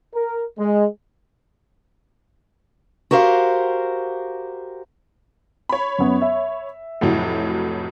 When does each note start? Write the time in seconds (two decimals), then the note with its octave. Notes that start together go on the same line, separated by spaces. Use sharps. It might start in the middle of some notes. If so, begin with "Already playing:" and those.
0.15 A#4
0.59 G#3
3.11 F#4 G4 A#4 C5 F5
5.69 C#5 B5
5.99 F#2 B3
6.22 E5
7.01 F1 A2 F#3